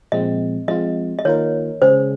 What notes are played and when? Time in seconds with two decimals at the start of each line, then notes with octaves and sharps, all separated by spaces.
0.12 A#2 F3 G#3 C4 D#5
0.68 F3 G#3 C4 F4 D#5
1.19 D#5
1.25 D#3 A#3 F4 A#4 C#5
1.82 C#3 G#3 C#4 G#4 C5